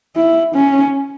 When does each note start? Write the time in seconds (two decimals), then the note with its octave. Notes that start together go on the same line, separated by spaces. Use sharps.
0.16 E4
0.55 C#4